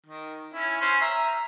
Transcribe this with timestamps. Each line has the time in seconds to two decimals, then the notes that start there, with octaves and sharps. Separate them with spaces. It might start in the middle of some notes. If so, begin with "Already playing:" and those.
0.06 D#3
0.53 C#4 E4
0.81 C#4 C5
1.01 E5 A#5